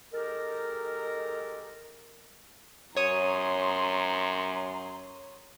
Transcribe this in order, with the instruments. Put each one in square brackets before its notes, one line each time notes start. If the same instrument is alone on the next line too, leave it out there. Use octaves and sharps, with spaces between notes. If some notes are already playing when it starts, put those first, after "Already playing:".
[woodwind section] G#3 D#4 G4 A4 A#4
[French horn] F#2 [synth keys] C#5 D#6 [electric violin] A#5 C6